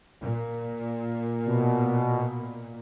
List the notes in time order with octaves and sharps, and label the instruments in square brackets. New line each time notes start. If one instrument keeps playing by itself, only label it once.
[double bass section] A#2
[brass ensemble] B2